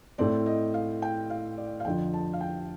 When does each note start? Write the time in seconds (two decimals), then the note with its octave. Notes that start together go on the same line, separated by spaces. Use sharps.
0.18 A2 A3 C4 D5
0.46 D#5
0.74 F5
1.02 G5
1.30 F5
1.57 D5
1.80 F5
1.85 F2 D3 F3 G5
2.14 A5
2.33 F5
2.41 G5